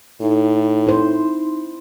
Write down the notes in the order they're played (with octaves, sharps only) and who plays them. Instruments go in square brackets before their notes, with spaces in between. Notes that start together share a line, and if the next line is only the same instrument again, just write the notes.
[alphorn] A2 [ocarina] D#4
[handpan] E4 C5